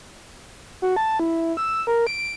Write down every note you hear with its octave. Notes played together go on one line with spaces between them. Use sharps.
F#4
A5
E4
E6
A#4
D7